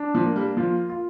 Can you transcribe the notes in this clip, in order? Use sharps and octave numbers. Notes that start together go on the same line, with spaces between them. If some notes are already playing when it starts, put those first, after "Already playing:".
Already playing: D4
F3
A#3
G3
F3 F4
F4